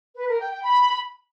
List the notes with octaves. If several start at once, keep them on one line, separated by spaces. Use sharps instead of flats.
B4
A#4
G5
G5
B5